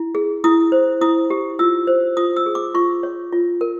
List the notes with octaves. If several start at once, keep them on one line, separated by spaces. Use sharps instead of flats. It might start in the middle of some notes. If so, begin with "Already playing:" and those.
Already playing: E4
G#4
E4 D#6
C5
E4 D#6
G4
F4 E6
C5
F4 D#6
E6
G#4
D6
F4 C#6
C#5
F4
A#4